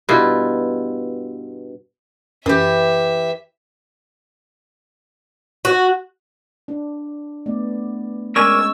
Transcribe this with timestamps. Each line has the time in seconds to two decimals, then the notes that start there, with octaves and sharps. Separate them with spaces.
0.09 G2 B2 E4 F4
2.46 F#2 E3 G4 E5
5.65 F#4
6.68 D4
7.46 A3 B3 D5
8.36 G#3 C#4 A#4 D5 G#5 C#6 E6